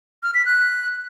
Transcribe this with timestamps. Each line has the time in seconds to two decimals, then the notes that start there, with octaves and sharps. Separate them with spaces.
0.23 F6
0.34 B6
0.46 F#6